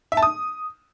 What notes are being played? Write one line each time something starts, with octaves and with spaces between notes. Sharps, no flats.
E5
A5
D#6